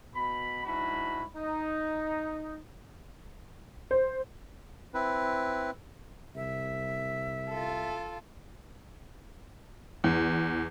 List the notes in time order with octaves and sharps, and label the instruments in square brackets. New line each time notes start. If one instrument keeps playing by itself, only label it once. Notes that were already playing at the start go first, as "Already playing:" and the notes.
[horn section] B2 B5
G#2 D4 E4 F#4 B5
D#4
[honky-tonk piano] C5
[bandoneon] C4 E4 B4
[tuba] C2 [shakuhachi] E5
[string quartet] F4 A4
[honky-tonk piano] E2